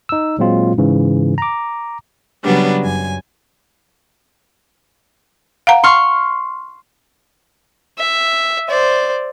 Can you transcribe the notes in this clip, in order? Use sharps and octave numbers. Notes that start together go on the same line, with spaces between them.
D#4 E6
A#2 F#3 G#3 C4 F4
G#2 C#3 E3
A#5 D6
C#3 F#3 G3 B3 D4
F#2 G#5
F5 F#5 A#5
C6 C#6 F6
E5
C5 D5